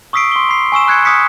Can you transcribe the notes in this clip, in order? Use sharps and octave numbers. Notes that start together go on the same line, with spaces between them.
C#6 D#6 E6 B6 C7 D7
C6 G7
B5 C7
G#5 C#6 E6 E7
B5 F#6 G#6 C#7
D#6 F6 B6 C#7